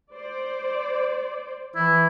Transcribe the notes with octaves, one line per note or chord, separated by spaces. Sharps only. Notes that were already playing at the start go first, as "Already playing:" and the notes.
C5 D5
E3 E4